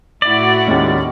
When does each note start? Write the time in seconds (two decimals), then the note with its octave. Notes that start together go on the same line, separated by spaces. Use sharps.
0.22 A2 E4 F#4 D5
0.67 D#2 G#3 C#4